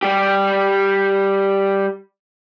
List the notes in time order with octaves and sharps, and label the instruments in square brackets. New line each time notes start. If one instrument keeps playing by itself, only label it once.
[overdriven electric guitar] G3 G4